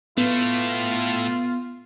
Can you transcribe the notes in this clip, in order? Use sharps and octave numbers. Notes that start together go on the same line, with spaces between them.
A2 A3 B3 F4